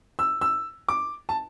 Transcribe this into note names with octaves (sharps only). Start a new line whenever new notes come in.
E6
E6
D6
A5